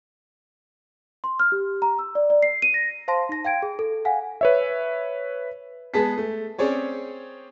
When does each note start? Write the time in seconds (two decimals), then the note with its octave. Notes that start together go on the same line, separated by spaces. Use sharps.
1.24 C6
1.40 F6
1.52 G4
1.82 A#5
1.99 E6
2.15 D5
2.30 D5
2.43 C7
2.62 D#7
2.74 A#6
3.08 C5 F5 A5 C6 A#6
3.29 D#4 A#6
3.45 F5 G5 G#6 D7
3.62 G#4
3.79 A4
4.05 F5 F#5 G#5
4.41 B4 C#5 E5
5.94 G#3 B3 G#4 A5 B6
6.18 A3
6.59 C4 C#4 G#4 C#5 D5